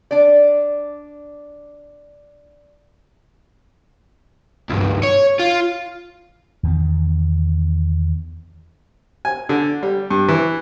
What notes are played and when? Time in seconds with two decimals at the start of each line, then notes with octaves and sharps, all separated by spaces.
0.11 D4 D5
4.69 C#2 G2
5.04 C#5
5.40 F4
6.63 E2 D#3 B3
9.25 G#5
9.49 D3
9.83 G3
10.11 G2
10.28 E3